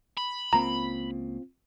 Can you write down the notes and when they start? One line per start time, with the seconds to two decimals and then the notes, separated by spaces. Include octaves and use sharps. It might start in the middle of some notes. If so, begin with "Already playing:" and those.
0.18 B5
0.53 C#2 A#3 C4 F4 A#5